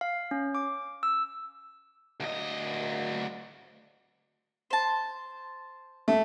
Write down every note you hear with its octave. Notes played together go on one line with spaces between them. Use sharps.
F5
C#4
D6
E6
D2 D#5
C5 A5
A3